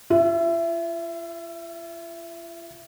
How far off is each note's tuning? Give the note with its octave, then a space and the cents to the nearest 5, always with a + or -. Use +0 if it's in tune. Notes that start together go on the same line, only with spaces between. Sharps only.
F4 -40 E5 +20